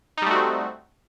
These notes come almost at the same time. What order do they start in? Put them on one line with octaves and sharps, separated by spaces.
D#4 G3 A3 F#4 C4